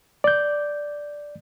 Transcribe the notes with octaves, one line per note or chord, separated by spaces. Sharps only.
D5 G6